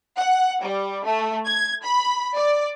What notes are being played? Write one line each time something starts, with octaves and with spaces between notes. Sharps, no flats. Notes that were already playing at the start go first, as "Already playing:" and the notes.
F#5
G3
A3
G#6
B5
D5